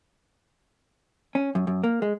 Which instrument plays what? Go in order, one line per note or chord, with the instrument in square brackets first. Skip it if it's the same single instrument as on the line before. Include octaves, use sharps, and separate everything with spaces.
[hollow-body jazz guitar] C#4
F#2
F#2
A#3
G#3